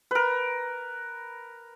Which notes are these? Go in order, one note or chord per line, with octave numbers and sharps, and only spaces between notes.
A#4 B4